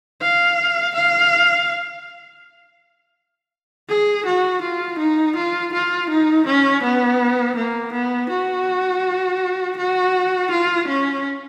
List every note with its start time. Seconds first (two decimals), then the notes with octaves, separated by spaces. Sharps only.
0.21 F5
0.95 F5
3.89 G#4
4.26 F#4
4.62 F4
4.98 D#4
5.36 F4
5.73 F4
6.10 D#4
6.46 C#4
6.83 B3
7.56 A#3
7.92 B3
8.30 F#4
9.77 F#4
10.51 F4
10.87 C#4